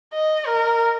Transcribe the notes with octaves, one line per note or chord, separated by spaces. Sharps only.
D#5
A#4